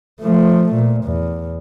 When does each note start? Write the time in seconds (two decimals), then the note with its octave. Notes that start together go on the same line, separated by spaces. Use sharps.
0.21 F3 A3
0.74 A#2
1.05 E2